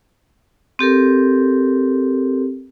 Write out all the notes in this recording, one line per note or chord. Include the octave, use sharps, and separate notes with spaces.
C4 G4 A4 A#4